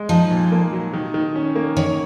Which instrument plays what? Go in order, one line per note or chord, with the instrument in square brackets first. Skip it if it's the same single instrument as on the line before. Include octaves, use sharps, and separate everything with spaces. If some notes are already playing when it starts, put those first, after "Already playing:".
Already playing: [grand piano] G#3
[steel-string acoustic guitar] F3 [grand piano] D#4
[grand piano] A#2
A#3
F#3
D#3
D#3
C#4
A#3
[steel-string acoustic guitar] D#3 [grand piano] C#5